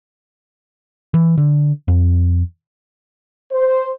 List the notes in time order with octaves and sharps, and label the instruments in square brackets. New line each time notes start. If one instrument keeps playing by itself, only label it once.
[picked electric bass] E3
D3
F2
[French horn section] C5